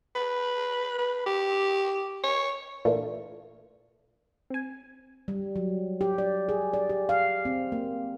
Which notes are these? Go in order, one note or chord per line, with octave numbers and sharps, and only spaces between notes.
B4
B4
G4
C#5
A#2 E3 A3 A#3 D4 F4
C4 G#5
G3
F#3
G4
D5
G#4
D5
G4
F5
C4
A#3